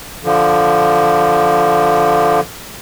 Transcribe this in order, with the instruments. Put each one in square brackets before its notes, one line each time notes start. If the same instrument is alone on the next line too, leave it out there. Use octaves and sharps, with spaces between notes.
[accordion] D3 F3